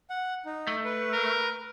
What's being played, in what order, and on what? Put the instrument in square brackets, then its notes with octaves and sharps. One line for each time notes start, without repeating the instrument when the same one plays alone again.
[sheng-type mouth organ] F#5
D#4
[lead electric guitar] A3
[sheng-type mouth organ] B4
[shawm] A#4